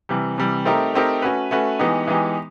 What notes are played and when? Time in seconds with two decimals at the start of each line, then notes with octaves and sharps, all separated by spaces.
0.09 C3 E3 G3
0.38 C3 E3 G3
0.65 A3 C4 D#4 G4 A#4
0.94 A3 C4 D#4 G4 A#4
1.22 A3 C#4 F#4 B4
1.51 A3 C#4 F#4 B4
1.79 E3 G#3 B3 D#4 G4
2.08 E3 G#3 B3 D#4 G4